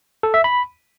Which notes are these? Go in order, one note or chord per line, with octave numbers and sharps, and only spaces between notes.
A4
E5
B5